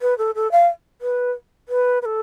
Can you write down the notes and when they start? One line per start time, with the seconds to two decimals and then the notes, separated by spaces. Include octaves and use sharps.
0.02 B4
0.18 A4
0.35 A4
0.52 F5
1.01 B4
1.69 B4
2.02 B4
2.05 A4